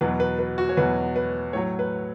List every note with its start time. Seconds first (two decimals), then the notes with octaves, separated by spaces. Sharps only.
0.01 E2 B2 F#3 B4
0.20 B4
0.39 B4
0.58 F#4
0.69 C#5
0.77 E2 B2 F#3 B4
1.16 B4
1.53 A2 F#3 C#5
1.79 B4